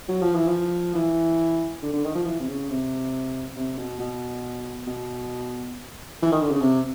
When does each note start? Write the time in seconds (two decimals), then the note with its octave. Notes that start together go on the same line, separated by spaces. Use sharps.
0.08 F#3
0.22 F3
0.35 E3
0.48 F3
0.95 E3
1.82 D3
1.93 D3
2.04 D#3
2.15 F3
2.26 E3
2.40 C3
2.48 C#3
2.69 C3
3.57 C3
3.78 B2
4.00 B2
4.87 B2
6.22 E3
6.32 D#3
6.41 D3
6.51 C#3
6.61 C3